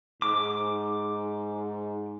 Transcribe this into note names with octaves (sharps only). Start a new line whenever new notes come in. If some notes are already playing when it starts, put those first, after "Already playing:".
G#2 D6